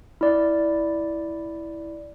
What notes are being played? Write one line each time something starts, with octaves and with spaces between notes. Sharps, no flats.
E4 D5